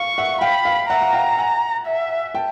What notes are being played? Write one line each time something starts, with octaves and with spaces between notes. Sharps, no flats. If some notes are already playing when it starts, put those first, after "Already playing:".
Already playing: F5 C#6
E5 F#5
F5 G5 B5
F5
E5 F#5 A#5
F#5
F5 G5
F#5 G#5
E5
G5 A5